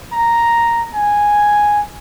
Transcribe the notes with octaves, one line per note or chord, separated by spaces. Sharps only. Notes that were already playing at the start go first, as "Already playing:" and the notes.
A#5
G#5